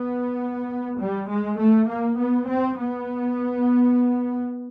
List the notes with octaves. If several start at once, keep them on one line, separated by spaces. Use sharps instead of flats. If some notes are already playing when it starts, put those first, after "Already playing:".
Already playing: B3
G3
G#3
A3
A#3
B3
C4
B3